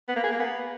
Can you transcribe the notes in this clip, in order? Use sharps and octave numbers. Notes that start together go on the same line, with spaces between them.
B3
A#3
G#4
A#3
B3